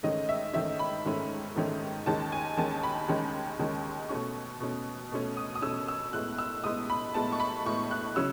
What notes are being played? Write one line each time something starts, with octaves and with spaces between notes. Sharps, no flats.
G#2 D#3 A3 C#4 D#5
E5
G#2 D#3 A3 C#4 E5
B5
G#2 D#3 A3 C#4
G#2 D#3 A3 C#4
D#2 D#3 G#3 C#4 A5
G#5
D#2 D#3 G#3 C#4 A5
B5
D#2 D#3 G#3 C#4
D#2 D#3 G#3 C#4
B2 A3 C#4 C#6
B2 A3 C#4
B2 A3 C#4
D#6
D#6
B2 A3 C#4 E6
E6
A2 G#3 B3 F#6
E6
A2 G#3 B3 D#6
B5
A2 G#3 B3 A5
C#6
B5
A2 G#3 B3 C#6
F#6
C#3 F#3 C#4 E6